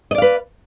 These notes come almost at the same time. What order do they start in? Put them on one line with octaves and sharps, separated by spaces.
D#5 D5 F5 B4